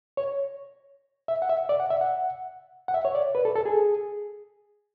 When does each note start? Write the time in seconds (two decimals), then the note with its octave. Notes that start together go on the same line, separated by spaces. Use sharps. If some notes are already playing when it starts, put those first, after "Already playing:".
0.17 C#5
1.28 E5
1.42 F#5
1.49 E5
1.69 D5
1.80 F#5
1.90 E5
2.01 F#5
2.88 F#5
2.94 E5
3.05 C#5
3.15 D5
3.35 B4
3.45 A4
3.56 A4
3.66 G#4